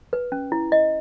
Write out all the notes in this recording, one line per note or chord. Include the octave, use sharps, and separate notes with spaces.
B4
C#4
E4
D#5